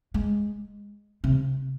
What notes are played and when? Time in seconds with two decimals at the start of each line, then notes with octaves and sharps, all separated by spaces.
0.14 G#3
1.24 C3